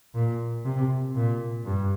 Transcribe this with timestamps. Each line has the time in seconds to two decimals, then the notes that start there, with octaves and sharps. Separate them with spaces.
0.14 A#2
0.65 C3
1.15 A#2
1.66 G2